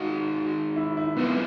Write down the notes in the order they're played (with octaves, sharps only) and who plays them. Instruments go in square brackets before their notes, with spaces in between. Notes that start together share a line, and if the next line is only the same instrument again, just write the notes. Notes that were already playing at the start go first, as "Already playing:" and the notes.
Already playing: [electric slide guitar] G#2 D#3 G#3 [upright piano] F4 F#4
[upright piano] E4
E4
[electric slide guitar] F#2 D3 F3 G#3 [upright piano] B3